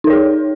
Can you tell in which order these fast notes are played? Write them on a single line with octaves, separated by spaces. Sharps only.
D#4 A#4 C#5 G#4